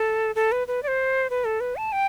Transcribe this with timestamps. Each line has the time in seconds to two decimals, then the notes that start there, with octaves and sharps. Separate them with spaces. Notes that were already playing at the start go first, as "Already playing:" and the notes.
Already playing: A4
0.35 A4
0.52 B4
0.68 B4
0.83 D5
0.88 C5
1.30 B4
1.45 A4
1.60 B4
1.76 A5
1.92 G5